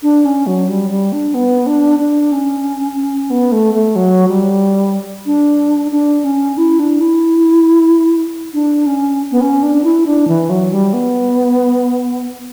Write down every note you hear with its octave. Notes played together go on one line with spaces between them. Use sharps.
D4
C#4
F#3
G3
G3
D4
B3
D4
D4
C#4
B3
A3
A3
F#3
G3
D4
D4
C#4
E4
D4
E4
D4
C#4
B3
C#4
D4
E4
D4
E3
F#3
G3
B3